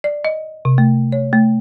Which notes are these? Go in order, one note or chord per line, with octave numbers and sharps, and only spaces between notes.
D5
D#5
C3
A3
C#5
A3